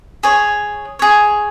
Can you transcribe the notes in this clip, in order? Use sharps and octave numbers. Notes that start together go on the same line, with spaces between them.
G#4 C#5
G#4 C#5